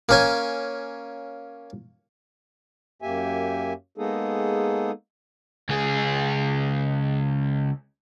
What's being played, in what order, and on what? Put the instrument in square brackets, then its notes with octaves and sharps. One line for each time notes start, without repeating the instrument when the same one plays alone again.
[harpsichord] A#3 C#4 G#5
[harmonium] F#2 A#3 G4 E5 G#5
G#3 A#3 B3 D#4 G#4 A4
[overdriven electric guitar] C#2 G#4